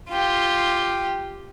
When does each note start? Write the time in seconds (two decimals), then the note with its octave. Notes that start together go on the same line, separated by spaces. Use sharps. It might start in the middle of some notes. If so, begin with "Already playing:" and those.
0.10 F4 G4